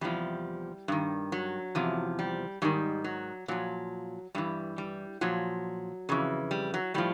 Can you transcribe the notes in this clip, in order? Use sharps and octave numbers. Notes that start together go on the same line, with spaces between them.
E2 C3 F3 G3
G2 D#3
F#3
E2 C3 F3
G3
G#2 D#3 G3
F#3
A#2 F3 F#3
G2 E3 G3
G3
A#2 F3 F#3
F2 C#3 E3
G3
F#3
A2 F3 G3